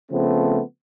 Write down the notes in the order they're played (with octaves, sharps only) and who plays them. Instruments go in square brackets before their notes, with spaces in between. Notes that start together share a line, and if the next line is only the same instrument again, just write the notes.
[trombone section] C#3 F3 A3 B3 C4